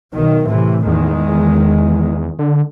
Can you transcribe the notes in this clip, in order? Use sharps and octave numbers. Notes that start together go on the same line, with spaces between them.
B1 D#3
A2 C3 E3
E2 D#3 G#3
D3